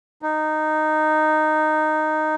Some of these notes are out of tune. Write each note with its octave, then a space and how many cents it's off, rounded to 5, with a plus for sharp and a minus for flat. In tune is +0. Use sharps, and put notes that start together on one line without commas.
D#4 -10